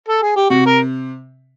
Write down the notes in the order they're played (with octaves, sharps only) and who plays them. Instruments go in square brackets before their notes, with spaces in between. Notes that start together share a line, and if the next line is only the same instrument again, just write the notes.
[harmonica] A4
G#4
G4
[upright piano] C3 [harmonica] F#4
[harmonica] A#4